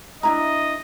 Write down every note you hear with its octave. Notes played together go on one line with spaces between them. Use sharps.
D4 E4 D#5 A#5